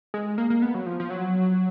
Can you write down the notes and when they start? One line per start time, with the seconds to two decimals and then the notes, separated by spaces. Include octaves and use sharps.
0.14 G#3
0.38 A#3
0.50 A#3
0.62 B3
0.74 F#3
0.86 F3
1.00 F3
1.10 F#3